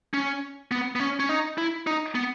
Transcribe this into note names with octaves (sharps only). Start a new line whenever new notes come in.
C#4
B3
B3
C#4
C#4
D#4
E4
D#4
B3